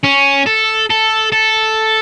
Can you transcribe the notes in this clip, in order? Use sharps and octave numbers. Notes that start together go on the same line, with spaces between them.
C#4
A4
A4
A4